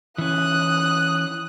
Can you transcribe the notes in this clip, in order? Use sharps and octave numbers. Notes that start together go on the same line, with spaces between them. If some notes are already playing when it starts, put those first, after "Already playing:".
E3 C#4 D#6 F#6